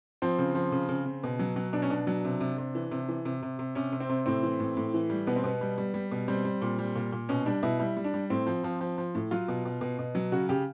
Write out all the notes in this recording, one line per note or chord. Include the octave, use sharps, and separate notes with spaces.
F3 C4
C#3
F3
C#3
C#3
C#3
B2
F#3
F#3
B2 D4
C#4
B2 D4
F#3
C3
C3
C3
E3
C3
E3
C3
C3
C3
C3 C#4
C3
C4
C3
A2 C4
E3
A2
A2
E3
G3
B2 B3
C4
B2 B3
G3
G3
G3
B2
G3 C4
G3
A#2
G3
A#2
A#2
B2 C#4
G3 D4
B2 E4
G3 E4
G3
D4
G3
A2 C4
F3
F3
F3
F3
A2
F#3 F4
B2
B2
B2
B2
F#3
C#3 F#4
C#3 G4